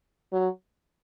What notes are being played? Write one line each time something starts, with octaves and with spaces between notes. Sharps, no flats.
F#3